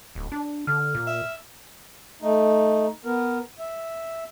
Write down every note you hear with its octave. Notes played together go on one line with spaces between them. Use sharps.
D1
D4
D3 F6
A#2
E5
A3 D#4
B3 A#4
E5